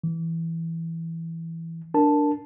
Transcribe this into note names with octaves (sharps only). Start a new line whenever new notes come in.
E3
D4 A#4 A5